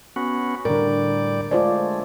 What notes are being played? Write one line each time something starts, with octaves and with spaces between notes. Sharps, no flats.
B3 C#4 F#4
A2 D3 G3 A#4 D5
G#3 A3 F4 C5 D5